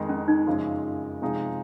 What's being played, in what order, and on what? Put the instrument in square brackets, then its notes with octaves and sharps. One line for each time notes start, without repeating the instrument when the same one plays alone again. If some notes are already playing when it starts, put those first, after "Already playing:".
Already playing: [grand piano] F2 D#3 G#3 D#4
[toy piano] C#4
D#4
[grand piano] F#2 C#3 F3 G#3
C3 F3 G#3 D#4 G#4